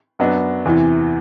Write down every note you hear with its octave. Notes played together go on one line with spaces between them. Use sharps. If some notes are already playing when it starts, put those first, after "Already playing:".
F#2 F#3 B3 D4
E2 C3 E3